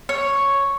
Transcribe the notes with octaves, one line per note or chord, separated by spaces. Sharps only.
C#5